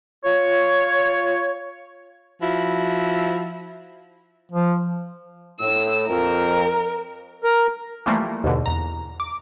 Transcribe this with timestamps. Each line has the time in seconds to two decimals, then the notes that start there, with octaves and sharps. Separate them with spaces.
0.24 F4 C#5
2.42 F3 E4 F#4
4.52 F3
5.60 A2 E6
6.09 F2 A#4
7.44 A#4
8.06 E3 F3 G3 A3 A#3
8.44 D#2 G#2 B2 D3
8.66 E2 A#5
9.20 D6